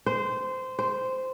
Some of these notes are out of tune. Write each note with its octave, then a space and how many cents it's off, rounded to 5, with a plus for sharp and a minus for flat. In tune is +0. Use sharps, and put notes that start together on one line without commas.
C5 -15
C5 -10